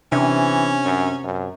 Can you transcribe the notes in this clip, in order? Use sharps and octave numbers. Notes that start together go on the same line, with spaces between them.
C3 E3 C#4 D4 E5
F#2
F#2